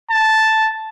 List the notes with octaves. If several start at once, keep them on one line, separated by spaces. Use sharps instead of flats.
A5